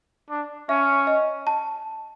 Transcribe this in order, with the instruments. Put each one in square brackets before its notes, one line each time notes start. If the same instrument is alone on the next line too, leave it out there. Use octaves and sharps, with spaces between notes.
[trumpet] D4
[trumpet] C#4 [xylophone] E5
[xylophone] D#5
A5